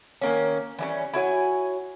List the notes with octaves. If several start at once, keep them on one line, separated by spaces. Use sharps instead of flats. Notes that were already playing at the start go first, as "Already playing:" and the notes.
D#3 A#3 C#4
E3 G3 C#4
E4 F#4 C#5 G#5